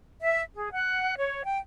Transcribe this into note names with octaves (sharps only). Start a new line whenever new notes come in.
E5
G#4
F#5
C#5
G5